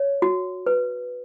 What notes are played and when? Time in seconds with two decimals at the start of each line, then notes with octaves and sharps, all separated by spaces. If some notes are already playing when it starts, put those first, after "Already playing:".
Already playing: C#5
0.22 F#4
0.67 B4